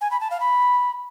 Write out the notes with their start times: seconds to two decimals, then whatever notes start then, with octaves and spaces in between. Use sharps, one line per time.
0.01 G#5
0.11 B5
0.21 A5
0.30 F5
0.40 B5